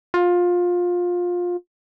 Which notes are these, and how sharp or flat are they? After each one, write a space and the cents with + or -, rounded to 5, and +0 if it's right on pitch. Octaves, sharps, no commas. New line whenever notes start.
F4 +20